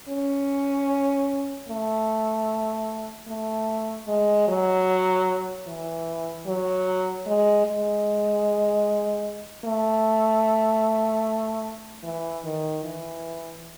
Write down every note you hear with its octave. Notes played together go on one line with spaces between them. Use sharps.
C#4
A3
A3
G#3
F#3
E3
F#3
G#3
G#3
A3
E3
D#3
E3